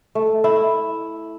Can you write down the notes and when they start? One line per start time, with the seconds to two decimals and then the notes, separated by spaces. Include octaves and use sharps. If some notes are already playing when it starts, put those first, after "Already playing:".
0.15 A3
0.44 E4